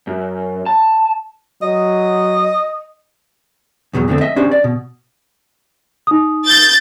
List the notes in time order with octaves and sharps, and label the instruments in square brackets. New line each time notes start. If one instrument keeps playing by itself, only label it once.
[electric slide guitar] F#2
A5
[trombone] F#3 [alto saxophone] D#5
[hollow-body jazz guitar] E2 B2 D#3 F#3
F2 D3 A3 C4
D#5 E5
C#4 D4 G4 C5
D5
B2
[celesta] D#4 D#6
[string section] G6 A6